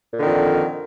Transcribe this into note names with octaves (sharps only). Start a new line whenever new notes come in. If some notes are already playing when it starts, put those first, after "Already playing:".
F2 A#2 D3 D#3